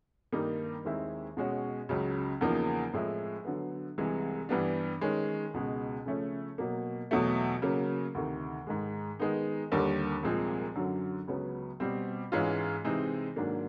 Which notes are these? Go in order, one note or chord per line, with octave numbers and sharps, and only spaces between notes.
G2 D#3 G3 A#3 D#4
D#2 D#3 G#3 C4 E4
B2 G#3 C#4 F#4
C#2 C#3 F#3
E2 C#3 F3 A#3 D#4
A2 F3 G#3 C4 E4
D3 F#3 B3
C2 C3 E3 G#3
G2 E3 G3 B3 D4
D#3 G#3 C#4
C#2 B2 G#3
C#3 F3 A3 C#4
B2 F#3 A#3
E2 B2 F#3 A3
C#3 F#3 A#3
D2 C3 D#3
G#2 D#3 G#3
D#3 G#3 B3 D#4
D#2 D3 G3 A#3
C2 A#2 F3 G#3 C4
F#2 D3 F#3
C#2 C#3 F#3 B3
B2 G3 C4
G#2 E3 G#3 C#4 F4
C3 E3 G#3 C4 D#4
G#2 D#3 F#3 A#3 D4